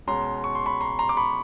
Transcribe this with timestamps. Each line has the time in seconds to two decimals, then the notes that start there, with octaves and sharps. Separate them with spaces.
0.07 B2 G#3 C#4 A#5 C6
0.44 C#6
0.55 C6
0.66 B5 C#6
0.81 A#5 C6
0.99 A#5 C6
1.09 D6
1.17 B5 C#6